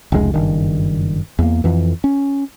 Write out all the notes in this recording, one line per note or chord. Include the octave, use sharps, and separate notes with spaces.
F1 C#2 G#3
F#1 G2 D#3
E2 A#3
F2 E3
C#4